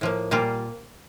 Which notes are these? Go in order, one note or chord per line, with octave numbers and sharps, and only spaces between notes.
A2 F3 A#3
A#2 G3 A#3 F4